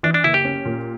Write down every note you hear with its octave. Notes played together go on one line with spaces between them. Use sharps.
E3 D4
D4
F#1 E4
G4
C#4
A#2